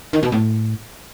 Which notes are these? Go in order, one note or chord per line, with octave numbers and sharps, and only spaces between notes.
D#3
B2
A2